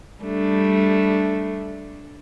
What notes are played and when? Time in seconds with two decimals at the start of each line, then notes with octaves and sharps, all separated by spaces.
0.22 G3 A3 D4